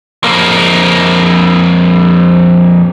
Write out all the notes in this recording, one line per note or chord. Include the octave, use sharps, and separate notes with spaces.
F2 A#3